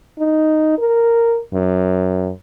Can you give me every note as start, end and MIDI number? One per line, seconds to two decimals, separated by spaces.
0.19 0.77 63
0.78 1.38 70
1.54 2.30 42